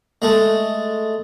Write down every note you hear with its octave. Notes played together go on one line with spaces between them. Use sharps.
G#3 A3